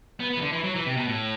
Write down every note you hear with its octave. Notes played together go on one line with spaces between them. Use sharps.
B3
B3
E3
D3
E3
F#3
E3
C3
B2
A2